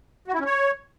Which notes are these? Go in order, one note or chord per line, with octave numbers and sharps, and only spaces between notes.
F#4
E4
C#4
C#5